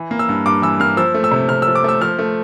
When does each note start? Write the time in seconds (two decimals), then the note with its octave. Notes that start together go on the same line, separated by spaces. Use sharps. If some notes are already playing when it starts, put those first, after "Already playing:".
Already playing: E3
0.11 A#3
0.19 E6
0.29 G2
0.46 G2 D6
0.62 E3 E6
0.80 A#3 F6
0.97 F3 E6
1.14 A3
1.24 E6
1.31 C3
1.49 C3 F6
1.62 E6
1.67 F3
1.75 D6
1.84 A3 E6
2.01 F3 F6
2.19 A3